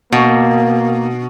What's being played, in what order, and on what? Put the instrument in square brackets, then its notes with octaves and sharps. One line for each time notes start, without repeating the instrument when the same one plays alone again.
[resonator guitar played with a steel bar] B2 [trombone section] A#3